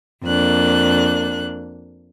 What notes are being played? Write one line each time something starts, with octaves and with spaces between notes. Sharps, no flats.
F2 A#3 D4 F#6